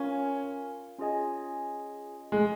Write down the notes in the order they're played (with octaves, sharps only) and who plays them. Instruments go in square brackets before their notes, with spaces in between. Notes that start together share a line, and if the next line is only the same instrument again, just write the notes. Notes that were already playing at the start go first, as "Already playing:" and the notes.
Already playing: [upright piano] C#4 [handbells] F4 A#4 F5 G#5
[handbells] C#4 F4 G#4 D#5 G#5
[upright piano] G#3